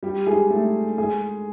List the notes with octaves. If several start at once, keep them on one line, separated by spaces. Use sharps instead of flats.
G3 G4
G#3 G#4
A3 A4
G#3 G#4